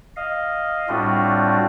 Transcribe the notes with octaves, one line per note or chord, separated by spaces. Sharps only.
D#5 F5
A2 G3 C4 D4 F4 F#4